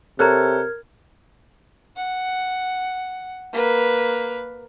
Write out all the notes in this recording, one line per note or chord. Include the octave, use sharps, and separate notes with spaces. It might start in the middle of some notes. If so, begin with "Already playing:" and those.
C3 A4 A#4 C#5 A#5 F6 F#6 G#6
F#5
A#3 B4